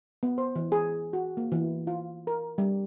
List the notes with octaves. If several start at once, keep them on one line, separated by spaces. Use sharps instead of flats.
B3
C5
E3
G#4
F#4
A#3
E3
F4
A#4
G3